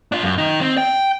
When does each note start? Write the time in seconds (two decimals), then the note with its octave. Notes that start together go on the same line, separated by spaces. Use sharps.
0.12 D4 F4
0.23 F#2
0.38 D#3 D#4
0.61 C4
0.78 G5